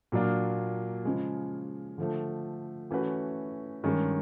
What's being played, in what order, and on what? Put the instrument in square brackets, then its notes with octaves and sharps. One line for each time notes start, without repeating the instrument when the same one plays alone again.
[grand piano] A#2 F#3 A#3 D4 F4
C#3 F3 G#3
D3 F3 A3
E3 A3 C#4 F#4 B4
G2 D#3 G#3 C#4